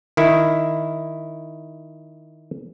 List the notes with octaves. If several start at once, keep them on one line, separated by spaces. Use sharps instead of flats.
D#3 E4